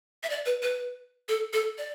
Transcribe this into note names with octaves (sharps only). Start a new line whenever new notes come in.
E5
D5
B4
B4
A4
A4
D5